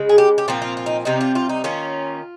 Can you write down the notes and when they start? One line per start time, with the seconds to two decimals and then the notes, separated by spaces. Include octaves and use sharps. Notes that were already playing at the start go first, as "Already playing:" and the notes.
Already playing: C#3 G#3
0.09 G#4
0.18 G4
0.38 G4
0.48 A#2 F3 C4 F4
0.62 F4
0.77 F4
0.86 D#4
1.05 C3 G3 C4 D#4
1.21 F4
1.35 F4
1.49 D#4
1.64 D#3 A#3 C#4 F4